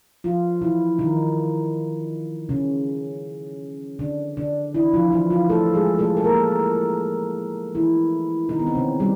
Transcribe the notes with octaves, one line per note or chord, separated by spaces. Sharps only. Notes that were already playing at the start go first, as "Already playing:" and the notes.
F3 F4
E3 E4
D#3 D#4
C#3 C#4
D3 D4
D3 D4
E3 E4
F3 F4
E3 E4
F3 F4
A3 A4
G#3 G#4
A3 A4
A4
A#3 A#4
E3 E4
D#3 D#4
B3
C4
C#3 C#4
G3 G4